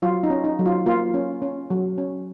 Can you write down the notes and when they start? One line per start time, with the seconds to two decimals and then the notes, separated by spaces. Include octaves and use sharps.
0.02 F#3 F4
0.23 D#4
0.30 C#4
0.44 D#4
0.59 F#3
0.66 F4
0.86 A#3 F4
1.14 C#4
1.42 C#4
1.70 F#3
1.98 C#4